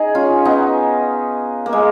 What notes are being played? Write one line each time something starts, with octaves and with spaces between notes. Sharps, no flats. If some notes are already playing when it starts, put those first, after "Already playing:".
Already playing: D#4 G#4
C#4 F4
B3 D#4
A#3
G#3